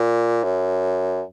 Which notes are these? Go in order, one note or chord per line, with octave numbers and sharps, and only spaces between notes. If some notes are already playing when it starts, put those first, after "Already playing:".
Already playing: A#2
F#2